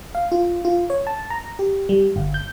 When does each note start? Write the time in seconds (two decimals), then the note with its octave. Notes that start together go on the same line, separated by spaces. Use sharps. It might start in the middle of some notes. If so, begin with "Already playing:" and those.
0.15 F5
0.32 F4
0.65 F4
0.90 C#5
1.07 A5
1.30 A#5
1.59 G4
1.89 G3
2.16 G1
2.34 G6